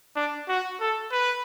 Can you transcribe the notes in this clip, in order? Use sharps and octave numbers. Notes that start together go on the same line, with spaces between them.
D4
F#4
A4
B4